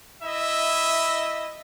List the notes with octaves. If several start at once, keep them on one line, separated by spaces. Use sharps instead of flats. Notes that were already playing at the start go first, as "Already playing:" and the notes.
E4 D#5 E5